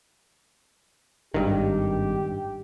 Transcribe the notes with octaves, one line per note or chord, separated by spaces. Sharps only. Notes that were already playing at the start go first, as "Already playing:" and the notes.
G#1 G2 D#3 G4